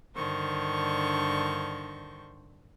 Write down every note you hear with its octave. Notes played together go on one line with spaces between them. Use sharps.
G2 D3 D#3 C5 C#6